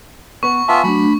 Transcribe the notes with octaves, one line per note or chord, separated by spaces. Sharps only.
B3 B4 C#6
B3 F4 E5 G#5 A5
F#3 A3 D4 B5